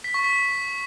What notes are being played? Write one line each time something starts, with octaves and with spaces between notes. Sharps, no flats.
B6
C#6
B6